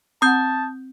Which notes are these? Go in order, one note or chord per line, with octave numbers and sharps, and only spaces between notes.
C4 F#5 A5 D#6 G6